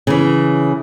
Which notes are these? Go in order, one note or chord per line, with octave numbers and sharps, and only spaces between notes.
C#3 E3